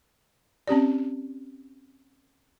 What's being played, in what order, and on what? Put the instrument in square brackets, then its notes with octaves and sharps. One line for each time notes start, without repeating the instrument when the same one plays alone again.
[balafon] C4 C#4 G4 D5